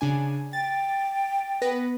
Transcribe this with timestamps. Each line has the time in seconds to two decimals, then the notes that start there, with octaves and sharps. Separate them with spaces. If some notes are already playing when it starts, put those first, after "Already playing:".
0.01 C#3 D4 G#5
0.53 G5 A6
1.62 B3 B4 A#6